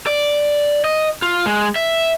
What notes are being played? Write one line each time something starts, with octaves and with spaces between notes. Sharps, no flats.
D5
D#5
F4
G#3
E5